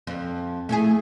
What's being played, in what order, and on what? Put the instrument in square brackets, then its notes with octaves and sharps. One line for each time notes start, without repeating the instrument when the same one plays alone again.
[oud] F2
A3 E4 G#4